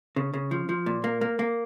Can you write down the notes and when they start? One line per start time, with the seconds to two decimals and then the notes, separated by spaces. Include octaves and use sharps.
0.16 C#3
0.34 C#3
0.51 F3
0.69 F3
0.86 A#2
1.04 A#3
1.21 A#3
1.39 A#3